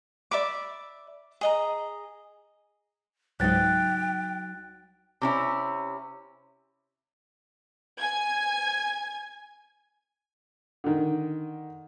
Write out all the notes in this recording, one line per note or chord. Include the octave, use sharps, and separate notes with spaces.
D5 E5 B5 D6
G#4 D#5 A#5
C#2 G#2 F#3 D#4 G5 F#6 A6
C3 C#4 E4
G#5 G#6
D3 D#3